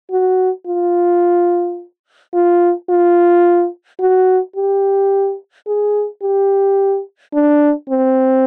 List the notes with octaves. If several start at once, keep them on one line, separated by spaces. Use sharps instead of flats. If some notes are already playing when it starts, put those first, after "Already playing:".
F#4
F4
F4
F4
F#4
G4
G#4
G4
D4
C4